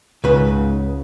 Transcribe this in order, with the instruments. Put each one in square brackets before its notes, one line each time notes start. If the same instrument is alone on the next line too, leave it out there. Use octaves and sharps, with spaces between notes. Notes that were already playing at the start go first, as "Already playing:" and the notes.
[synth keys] C#2 C#3 [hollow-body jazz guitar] G#2 B4